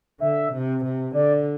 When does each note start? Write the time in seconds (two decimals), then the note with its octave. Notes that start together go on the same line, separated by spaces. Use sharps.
0.20 D3 E5
0.52 C3
0.84 C3
1.14 D3 D5